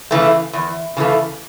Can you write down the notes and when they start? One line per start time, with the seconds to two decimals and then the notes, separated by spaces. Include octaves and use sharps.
0.11 C#3 E3 A3
0.53 E2
0.97 C#3 E3 A3